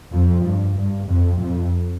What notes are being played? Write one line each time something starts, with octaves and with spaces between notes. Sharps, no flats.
F2 F3
G2
G2
F2
F2